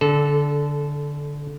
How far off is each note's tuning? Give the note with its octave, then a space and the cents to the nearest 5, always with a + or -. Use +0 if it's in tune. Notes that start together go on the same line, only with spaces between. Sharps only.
D3 -10 A4 -25